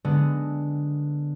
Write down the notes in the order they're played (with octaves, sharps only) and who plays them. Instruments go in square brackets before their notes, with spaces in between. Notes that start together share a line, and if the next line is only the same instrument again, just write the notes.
[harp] D3 G#3 B3